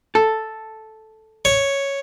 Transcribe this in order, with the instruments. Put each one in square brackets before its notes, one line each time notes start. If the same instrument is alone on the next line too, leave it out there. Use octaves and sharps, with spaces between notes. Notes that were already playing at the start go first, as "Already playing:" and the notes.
[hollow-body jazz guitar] A4
[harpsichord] C#5